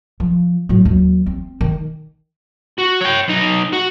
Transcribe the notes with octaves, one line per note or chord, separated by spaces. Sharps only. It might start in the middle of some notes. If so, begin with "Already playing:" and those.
F3
A2 F#3
D#2 F#3
C4
D#3
F#4
C#5 G5
B1 D#4
F#4